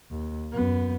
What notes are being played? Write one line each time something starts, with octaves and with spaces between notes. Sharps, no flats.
D#2
F#2 B3